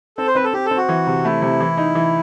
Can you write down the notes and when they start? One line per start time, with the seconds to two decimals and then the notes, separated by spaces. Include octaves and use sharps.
0.18 C4 A4
0.27 C5
0.35 C4 B4
0.44 A4
0.53 C4 G4
0.66 A4
0.71 C4
0.77 F#4
0.89 E3
1.07 C3
1.25 A3 E4
1.42 C3
1.60 E3
1.78 D#4
1.95 E3